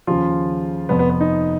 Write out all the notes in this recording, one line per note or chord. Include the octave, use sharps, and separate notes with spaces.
D#2 C#3 F3 F4
F1 F2 F3 B3
B3
B3
D#4